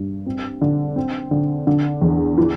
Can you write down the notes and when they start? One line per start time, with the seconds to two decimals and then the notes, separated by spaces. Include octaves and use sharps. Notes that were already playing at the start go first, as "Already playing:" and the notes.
Already playing: G2
0.26 C4
0.61 D3
0.96 C4
1.31 D3
1.67 D3
2.01 E2
2.38 E3